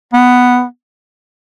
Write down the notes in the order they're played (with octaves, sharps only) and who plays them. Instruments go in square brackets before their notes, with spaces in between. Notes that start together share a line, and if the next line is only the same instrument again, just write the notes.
[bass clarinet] B3